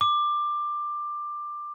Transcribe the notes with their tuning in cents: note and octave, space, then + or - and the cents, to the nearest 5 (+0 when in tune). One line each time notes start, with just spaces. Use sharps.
D6 +15